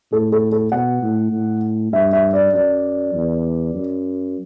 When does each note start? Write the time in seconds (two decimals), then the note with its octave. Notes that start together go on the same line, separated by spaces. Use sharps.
0.12 A2 A4
0.32 A4
0.52 A4
0.72 B2 F#5
1.02 A2
1.32 A2
1.93 G2 E5
2.13 E5
2.33 D5
2.53 F#2 D5
3.14 E2
3.74 F#2